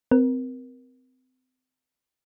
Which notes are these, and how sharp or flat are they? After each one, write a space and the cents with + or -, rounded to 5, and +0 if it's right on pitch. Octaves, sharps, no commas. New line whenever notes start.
C4 -30 A#4 +25